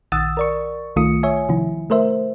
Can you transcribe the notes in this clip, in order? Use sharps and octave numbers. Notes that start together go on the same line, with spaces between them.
A#1 D#3 F#5 D#6 E6 A6
A#4 D5 C#6
C2 D#3 A3 F4 D#6 C#7
C#5 E5 G#5
C3 D#3 F3 E4
A3 A#4 C5 E5